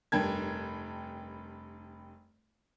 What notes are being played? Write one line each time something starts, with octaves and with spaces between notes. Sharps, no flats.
F1 G2 A#4 G5 A5 G#6